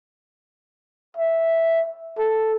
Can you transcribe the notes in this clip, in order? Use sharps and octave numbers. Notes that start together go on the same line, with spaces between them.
E5
A4